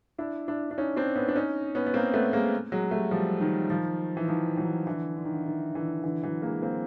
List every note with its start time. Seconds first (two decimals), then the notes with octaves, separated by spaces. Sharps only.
0.18 D4 E4
0.48 D4 E4
0.71 D4
0.78 C#4 D#4
0.97 C4 D4
1.16 B3 C#4
1.28 D4
1.36 C#4 D#4
1.75 B3 C#4
1.86 B3
1.94 A#3 C4
2.14 A3 B3
2.33 G#3 A#3
2.72 F#3 G#3
2.91 G3 A3
3.11 F3 G3
3.40 D#3
3.70 D#3 F3
4.17 E3
4.28 D#3 F3
4.57 E3 F#3
4.86 D3 E3
5.17 D3
5.25 D#3
5.33 D3
5.46 D#3
5.75 D3 E3
6.04 D3 E3
6.23 E3 F#3
6.42 G#3 A#3
6.62 A#3 C4